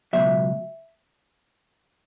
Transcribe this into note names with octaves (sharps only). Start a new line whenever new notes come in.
C#2 B2 F#3 E5